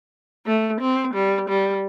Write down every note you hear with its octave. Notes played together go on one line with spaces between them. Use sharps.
A3
C4
G3
G3